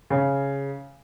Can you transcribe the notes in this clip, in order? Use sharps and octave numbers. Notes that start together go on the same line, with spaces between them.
C#3